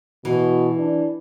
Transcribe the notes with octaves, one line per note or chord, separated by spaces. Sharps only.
B2 E3
D4